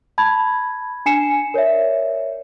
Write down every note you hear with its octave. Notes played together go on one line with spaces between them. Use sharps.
A5 B5 G#6
D4 G#5 C7 C#7 E7
A#4 C#5 D5 E5